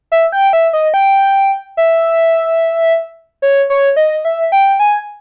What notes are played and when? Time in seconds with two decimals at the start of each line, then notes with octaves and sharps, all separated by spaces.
0.12 E5
0.32 G5
0.53 E5
0.73 D#5
0.94 G5
1.77 E5
3.42 C#5
3.70 C#5
3.97 D#5
4.25 E5
4.52 G5
4.80 G#5